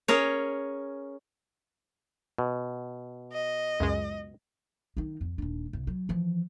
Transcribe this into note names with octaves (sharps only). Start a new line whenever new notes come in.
C#4 G#4 A#4 C#5
B2
D#5
C#2 F#2 G#3
D#3 D#4
F2
D#1 D4
C2
F#3
E3 F3